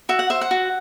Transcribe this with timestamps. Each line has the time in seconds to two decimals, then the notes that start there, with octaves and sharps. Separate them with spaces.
0.09 F#4 E5
0.19 F#5
0.30 C5 E5
0.41 F#5
0.51 F#4